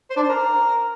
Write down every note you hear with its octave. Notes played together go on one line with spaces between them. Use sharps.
C5
D4
C5
A#4